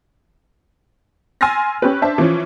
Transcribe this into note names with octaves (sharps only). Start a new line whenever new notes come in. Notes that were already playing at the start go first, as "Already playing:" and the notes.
G#5 C6 E6 F6 A6 A#6
C#4 G4 B4
D4 C5 E5 A5
E3 F3 C#4